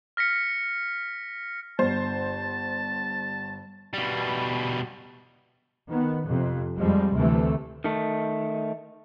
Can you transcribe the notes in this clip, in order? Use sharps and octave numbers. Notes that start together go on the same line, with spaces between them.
F6 A#6 B6 C#7
G1 C5 A5
B2 G3
D#3 B3
F2 C3
F2 F3 G3 G#3
D2 C3 E3 A3
D#3 A3